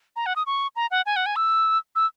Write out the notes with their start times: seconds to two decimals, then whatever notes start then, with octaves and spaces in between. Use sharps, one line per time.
0.16 A#5
0.26 F#5
0.36 D#6
0.46 C#6
0.76 A#5
0.91 F#5
1.06 G#5
1.16 F#5
1.26 G#5
1.36 E6
1.96 E6